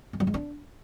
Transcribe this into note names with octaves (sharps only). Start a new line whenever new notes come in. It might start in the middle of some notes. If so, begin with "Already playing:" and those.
G#3
G3
G#3
D4